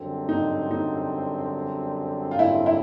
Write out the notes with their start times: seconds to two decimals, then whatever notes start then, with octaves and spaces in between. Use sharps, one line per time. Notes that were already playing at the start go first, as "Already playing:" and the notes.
Already playing: F#2 D3 G3 C4
0.29 D#4
0.71 D#4
2.31 F4
2.39 E4
2.66 E4